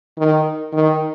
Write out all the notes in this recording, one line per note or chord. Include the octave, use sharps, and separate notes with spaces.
D#3
D#3